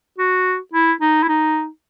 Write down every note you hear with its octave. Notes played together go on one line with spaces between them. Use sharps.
F#4
E4
D#4
E4
D#4